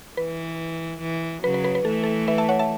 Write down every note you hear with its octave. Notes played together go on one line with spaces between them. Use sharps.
E3 B4
E3
C#3 F#3 B4
B4
B4
B4
E3 A3 A4
A4
B4 E5
E5 A5
C#5 F#5
E5 A5